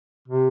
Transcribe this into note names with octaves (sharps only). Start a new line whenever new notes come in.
C3